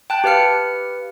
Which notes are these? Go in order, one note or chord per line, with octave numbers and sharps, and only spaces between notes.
G5 A5 F#6
G4 B4 F5 F6 C#7